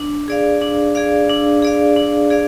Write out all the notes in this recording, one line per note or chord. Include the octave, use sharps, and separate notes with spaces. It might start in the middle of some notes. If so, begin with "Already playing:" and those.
Already playing: D4
G#4 D5 F5
D4
G#4 D5 F5
D4
G#4 D5 F5
D4
G#4 D5 F5